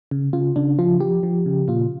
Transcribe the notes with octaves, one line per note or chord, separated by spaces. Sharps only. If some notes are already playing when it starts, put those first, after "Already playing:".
C#3
C#3 F4
C#3 D4
F3 F4
F3 G4
F3
C#3
A#2 F4